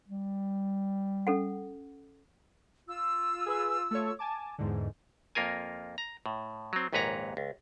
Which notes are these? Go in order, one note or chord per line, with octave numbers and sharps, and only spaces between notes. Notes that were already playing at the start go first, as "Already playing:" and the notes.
G3
C#4 A4 F#5
F4 E6
G#4 B4 G#5
A3 A4 C#5
G#5 A5 D6
E2 G#2 D3
F2 A#3 F4 A#4 G#5
A#5
A2
F#3 C4
A#1 D#2 G#2 B4 C#5 A#5
C#2